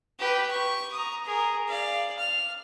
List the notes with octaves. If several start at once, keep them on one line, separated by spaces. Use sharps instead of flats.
G4 B4
C#6
A#5 D#6
G#4 A#4
D5 F5
F6